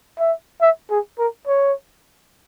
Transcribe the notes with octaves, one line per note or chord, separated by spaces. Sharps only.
E5
E5
G#4
A#4
C#5